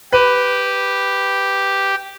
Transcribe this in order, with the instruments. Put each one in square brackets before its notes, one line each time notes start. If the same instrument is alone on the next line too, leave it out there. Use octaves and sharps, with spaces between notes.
[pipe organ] G4 [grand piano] B4